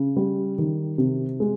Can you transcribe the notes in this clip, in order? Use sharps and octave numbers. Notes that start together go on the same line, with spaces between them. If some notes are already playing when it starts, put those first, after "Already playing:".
Already playing: C#3
G3
D#3
C3
G#3